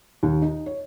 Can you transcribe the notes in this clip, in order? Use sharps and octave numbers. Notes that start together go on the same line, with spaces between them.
D#2
D#4
C#5